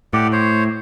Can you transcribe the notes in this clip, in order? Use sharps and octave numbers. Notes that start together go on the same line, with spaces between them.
A2 G4 D5 F#5
C5 C#5